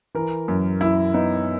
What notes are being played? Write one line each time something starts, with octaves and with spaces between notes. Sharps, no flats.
E3 A#4
F#2
F#2 E4
B3 D#4